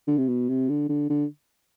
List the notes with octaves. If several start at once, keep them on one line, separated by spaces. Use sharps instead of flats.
D3
C3
B2
C3
D3
D3
D3